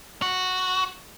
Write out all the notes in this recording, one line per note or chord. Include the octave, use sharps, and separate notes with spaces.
F#4